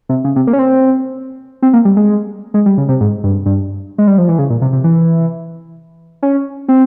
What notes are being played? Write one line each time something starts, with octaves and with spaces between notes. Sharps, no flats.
C3
C#3
C3
A#3
C#4
C4
C4
A#3
G3
G#3
G#3
G3
C#3
C3
G#2
G2
G2
G#3
G3
F3
E3
C#3
A#2
C3
C3
E3
C#4
C4